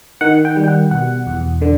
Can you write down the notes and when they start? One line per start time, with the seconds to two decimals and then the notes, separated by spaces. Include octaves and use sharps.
0.21 D#3 F#5
0.45 G5
0.56 G3
0.64 G5
0.68 F#5
0.91 B2 F#5
1.27 E2
1.61 D3